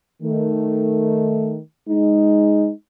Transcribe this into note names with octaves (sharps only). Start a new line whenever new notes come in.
D#3 A3
G#3 D#4